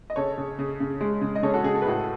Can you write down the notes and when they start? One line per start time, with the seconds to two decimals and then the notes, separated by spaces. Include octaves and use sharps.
0.10 D#5
0.16 C#3 A4 C#5
0.38 C#3
0.59 C#3
0.80 C#3
1.01 G#3
1.21 C#3
1.35 D#5
1.43 C#3 A4 C#5
1.54 F#4 A4
1.63 C#3 G#4
1.75 A4
1.82 B4
1.85 A2 F#4 A4